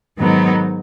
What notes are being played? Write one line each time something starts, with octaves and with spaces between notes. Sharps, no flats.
G#2 D#3 F#3 B3 D#4